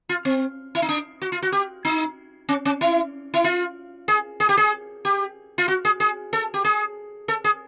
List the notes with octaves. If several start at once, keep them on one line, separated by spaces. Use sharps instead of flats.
F4
C4
E4
D#4
D4
F#4
F4
F#4
G4
D#4
C#4
C#4
E4
E4
F4
G#4
G#4
G4
G#4
G4
F4
F#4
G#4
G#4
A4
G4
G#4
A4
G#4